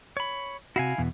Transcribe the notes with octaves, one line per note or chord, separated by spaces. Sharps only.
C#5 B5
C3 E4 F#4 F5 G#5
E2 B2